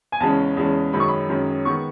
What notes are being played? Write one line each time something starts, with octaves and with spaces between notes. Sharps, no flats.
G#5
E2 C#3 G#3 C#4 A5
E2 C#3 G#3 C#4
F#2 D#3 G#3 C#4 B5
C#6
B5
F#2 D#3 G#3 C#4
D#3 G#3 B3 C#6